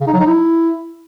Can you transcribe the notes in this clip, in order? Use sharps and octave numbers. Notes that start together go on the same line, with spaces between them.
C#3
D#4
F#3
D#4
E4